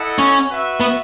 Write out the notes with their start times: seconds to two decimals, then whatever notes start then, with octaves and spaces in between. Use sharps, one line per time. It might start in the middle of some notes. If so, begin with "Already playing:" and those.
Already playing: E4 A4 D#5 F#5
0.19 C#4
0.49 F#4 B4 E5
0.80 B3